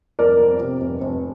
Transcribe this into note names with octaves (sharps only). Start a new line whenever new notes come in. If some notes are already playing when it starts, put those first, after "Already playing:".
F1 A#4 D5
F2
C3
F1
F1